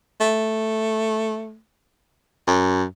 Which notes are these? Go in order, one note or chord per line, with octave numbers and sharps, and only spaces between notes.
A3
F#2